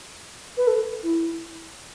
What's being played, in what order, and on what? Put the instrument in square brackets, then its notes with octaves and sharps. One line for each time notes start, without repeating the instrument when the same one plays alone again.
[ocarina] B4
A4
E4